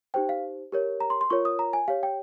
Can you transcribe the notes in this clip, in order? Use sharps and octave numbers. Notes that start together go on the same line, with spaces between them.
D#4 G4 C5 G5
F5
G4 A#4 C#5
A#5
C6
C6
F4 A#4 C#5 C#6
D#6
A#5
G#5
G4 C#5 F5
G5